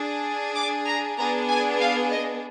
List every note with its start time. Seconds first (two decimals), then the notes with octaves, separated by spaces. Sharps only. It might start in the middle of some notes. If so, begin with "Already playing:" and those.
Already playing: D4 G#4
0.55 D6
0.86 A#5
1.16 B3 D4 G#4 A#5
1.49 G#5
1.80 F5
2.10 D#5